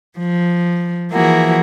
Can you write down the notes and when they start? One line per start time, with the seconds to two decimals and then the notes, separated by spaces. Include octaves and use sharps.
0.18 F3
1.11 E3 F3 A#3 E4 F#4 G#4